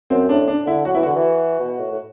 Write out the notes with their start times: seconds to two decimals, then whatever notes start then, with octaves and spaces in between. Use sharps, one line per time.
0.10 F#2 C4
0.29 A2 D4
0.48 D4
0.66 D3 E4
0.85 F#3 F#4
0.95 E3 E4
1.03 D3 F#4
1.16 E3
1.60 B2
1.79 A2
1.91 A2